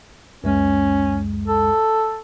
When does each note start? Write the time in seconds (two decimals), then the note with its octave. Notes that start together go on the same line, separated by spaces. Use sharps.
0.44 C#2 F#2 G#3 C#4
1.47 A4